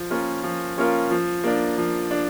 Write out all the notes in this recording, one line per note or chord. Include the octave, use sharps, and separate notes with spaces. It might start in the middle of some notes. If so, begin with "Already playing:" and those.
Already playing: F3
A#3 C#4 F4 A#4
F3
A#3 C#4 F4 A#4
F3
A#3 D4
F3
D4